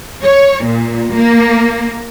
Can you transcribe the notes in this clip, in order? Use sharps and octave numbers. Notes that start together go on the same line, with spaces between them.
C#5
A#2
A#3